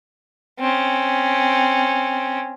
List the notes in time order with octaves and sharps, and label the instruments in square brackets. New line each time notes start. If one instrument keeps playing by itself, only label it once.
[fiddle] C4 C#4